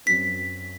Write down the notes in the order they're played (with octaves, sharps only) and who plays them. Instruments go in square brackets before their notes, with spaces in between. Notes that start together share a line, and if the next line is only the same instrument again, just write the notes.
[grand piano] F#2 F#3 C4 [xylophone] B6